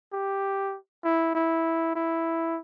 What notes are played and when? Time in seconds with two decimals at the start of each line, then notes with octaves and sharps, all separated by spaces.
0.13 G4
1.04 E4
1.34 E4
1.95 E4